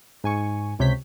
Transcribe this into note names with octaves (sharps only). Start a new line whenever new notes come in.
G#2 G#5 C#6
C#2 C3 C#5 G6 B6